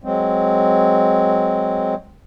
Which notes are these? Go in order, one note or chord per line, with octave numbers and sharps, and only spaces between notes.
F#3 G#3 C4